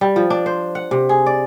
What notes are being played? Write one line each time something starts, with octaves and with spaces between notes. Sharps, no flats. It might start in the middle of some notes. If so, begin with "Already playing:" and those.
G3
F3
D4
C5
F#5
C3
G#4
D5